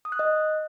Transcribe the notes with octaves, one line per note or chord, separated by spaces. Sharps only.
D#6
F#6
D#5